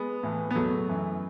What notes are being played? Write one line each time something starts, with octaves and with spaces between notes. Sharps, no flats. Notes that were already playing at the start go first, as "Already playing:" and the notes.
Already playing: G#3 B3
A2 E3
B3
E2 B2 F#3 A3
F#2 E3